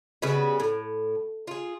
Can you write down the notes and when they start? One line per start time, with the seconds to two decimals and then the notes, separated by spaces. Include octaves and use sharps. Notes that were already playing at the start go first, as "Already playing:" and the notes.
0.22 C#3 G3 B3 F#4
0.60 A2
1.47 F4 G#4